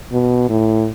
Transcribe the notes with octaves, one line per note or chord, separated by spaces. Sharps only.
B2
A2